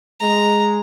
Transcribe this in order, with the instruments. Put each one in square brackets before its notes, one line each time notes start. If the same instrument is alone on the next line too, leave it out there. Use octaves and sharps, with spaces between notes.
[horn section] G#3 [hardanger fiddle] A#5